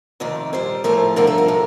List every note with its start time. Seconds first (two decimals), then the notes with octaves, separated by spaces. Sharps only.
0.20 F2 C3 D#3 A3 D5
0.53 A#2 G3 C5
0.84 A2 F3 A3 A#4
1.16 G2 D3 F3 A3 A#4
1.27 A4
1.38 A#4
1.48 A2